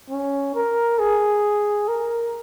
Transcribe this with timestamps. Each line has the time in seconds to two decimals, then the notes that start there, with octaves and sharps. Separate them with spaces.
0.10 C#4
0.55 A#4
0.99 G#4
1.89 A#4